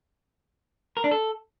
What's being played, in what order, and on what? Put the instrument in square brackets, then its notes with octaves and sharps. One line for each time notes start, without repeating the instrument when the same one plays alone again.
[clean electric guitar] A#4
D4
A4